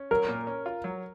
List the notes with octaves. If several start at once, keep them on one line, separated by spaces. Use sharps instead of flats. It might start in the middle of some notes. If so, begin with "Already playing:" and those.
Already playing: C#4
F#3 A#4
A#2
C#4
F4
F#3